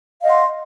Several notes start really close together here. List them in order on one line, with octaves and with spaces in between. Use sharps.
F5 D#5 F#5 C6